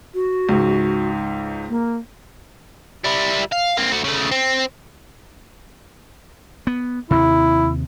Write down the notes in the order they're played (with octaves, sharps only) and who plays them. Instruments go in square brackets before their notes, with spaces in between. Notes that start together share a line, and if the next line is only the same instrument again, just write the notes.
[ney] F#4
[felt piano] C#2 G#2
[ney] A#3
[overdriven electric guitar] G3 E4
F5
A#3 C4
A3 F#4
C#3 A3
C4
[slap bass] B3
[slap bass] D#2 C3 [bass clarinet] E4